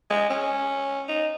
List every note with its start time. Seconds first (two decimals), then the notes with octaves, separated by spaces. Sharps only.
0.10 G#3
0.30 C#4
1.08 D#4